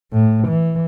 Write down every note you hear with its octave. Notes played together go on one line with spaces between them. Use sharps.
A2
E3